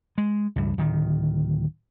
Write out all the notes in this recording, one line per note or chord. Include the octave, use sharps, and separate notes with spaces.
G#3
C#2 G2
D1 D#3